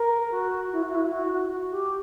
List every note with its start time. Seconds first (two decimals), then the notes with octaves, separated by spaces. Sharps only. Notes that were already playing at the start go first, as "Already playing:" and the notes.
Already playing: A#4
0.31 F#4
0.72 E4
0.82 F#4
0.94 E4
1.11 F#4
1.32 F#4
1.52 F#4
1.72 G4